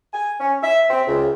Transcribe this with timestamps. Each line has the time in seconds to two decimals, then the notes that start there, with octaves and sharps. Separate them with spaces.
0.13 G#5
0.40 C#4
0.63 E5
0.90 C4
1.07 C#2